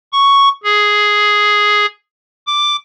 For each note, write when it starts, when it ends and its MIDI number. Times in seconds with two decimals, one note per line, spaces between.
0.13 0.49 85
0.64 1.86 68
2.47 2.76 86